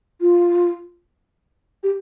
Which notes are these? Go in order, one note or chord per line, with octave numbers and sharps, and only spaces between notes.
F4
G4